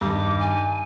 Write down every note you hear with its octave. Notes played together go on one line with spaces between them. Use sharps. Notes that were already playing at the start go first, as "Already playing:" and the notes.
G2 D#3 D6
G#5